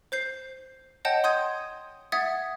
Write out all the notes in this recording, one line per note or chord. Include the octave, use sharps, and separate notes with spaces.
C5 G6 C7
C#5 D#5 F#5 G5 A5 G6
C6 D#6 G6 G#6 D#7
E5 F#5 D#6 G#6 A6 B6